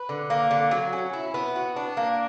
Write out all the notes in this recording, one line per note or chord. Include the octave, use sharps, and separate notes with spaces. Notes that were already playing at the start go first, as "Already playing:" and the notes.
Already playing: B4
D3
A#3
D3
F#3
C#4
E4
B3
F#4
D4
A#3